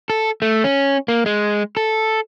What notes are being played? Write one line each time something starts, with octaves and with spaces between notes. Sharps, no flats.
A4
A3
C#4
A#3
G#3
A4